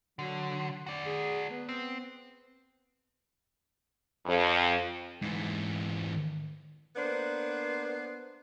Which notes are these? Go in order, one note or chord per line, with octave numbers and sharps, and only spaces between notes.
D3 F#3
F#4 D5
G#4
B3
C4
F2
G#2 E3
A#3 B3 D4 C5